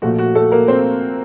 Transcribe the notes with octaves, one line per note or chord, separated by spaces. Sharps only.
A#1 A#2 F3 A3 F#4
F#4
A3 A4
A#3 A#4
C4 C5